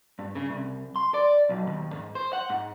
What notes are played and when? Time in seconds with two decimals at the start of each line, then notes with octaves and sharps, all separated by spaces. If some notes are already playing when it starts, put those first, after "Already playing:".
0.19 G2
0.35 C#3
0.50 C2
0.96 C6
1.14 D5
1.49 B1
1.67 D#2
1.93 G#2
2.15 C5
2.33 F#5
2.50 G#2